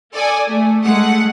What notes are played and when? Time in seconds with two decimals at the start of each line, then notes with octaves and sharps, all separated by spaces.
0.14 A4 D5 G#5 D#6
0.48 A3
0.83 G#3 A3 F#5